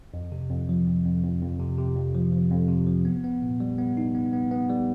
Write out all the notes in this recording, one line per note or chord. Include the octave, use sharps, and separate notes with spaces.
F2
C3
F2
F3
F2
F2
F2
F2
C3
C3
F2
F3
F3
F2
C3
F3
B3
B3
A#2
G3
B3
D#4
B3
B3
B3
G3